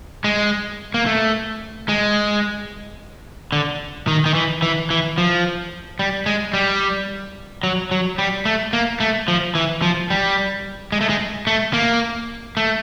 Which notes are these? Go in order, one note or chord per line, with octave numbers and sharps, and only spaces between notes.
G#3
A#3
A3
G#3
D3
D#3
D#3
E3
E3
E3
F3
G3
G#3
G3
F#3
F#3
G3
A3
A#3
A3
F3
E3
F3
G3
G#3
A3
G#3
A3
A#3
A3